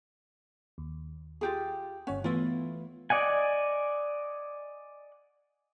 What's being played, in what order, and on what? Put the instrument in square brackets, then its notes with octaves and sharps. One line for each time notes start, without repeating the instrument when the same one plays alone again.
[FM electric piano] D#2
[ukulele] F4 G4 G#4
[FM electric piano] G1 C#5 F#5 [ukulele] C#4
[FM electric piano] E3 A3 B3 [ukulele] E4 F4
[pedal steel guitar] D5 D#5 F#5 G#5